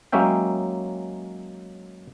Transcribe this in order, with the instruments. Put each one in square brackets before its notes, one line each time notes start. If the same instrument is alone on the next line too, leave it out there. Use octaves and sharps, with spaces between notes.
[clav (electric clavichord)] F#3 G#3 A#3 C#4 E5 G5